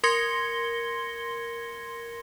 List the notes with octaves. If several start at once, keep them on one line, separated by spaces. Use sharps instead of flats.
A#4 C6 G#6 A#6 C#7 G7